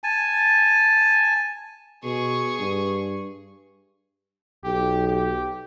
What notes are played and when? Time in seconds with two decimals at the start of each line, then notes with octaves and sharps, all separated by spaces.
0.04 G#5 A5
2.04 B2 G#4 C#6
2.59 G2
4.64 B1 G4
5.07 G4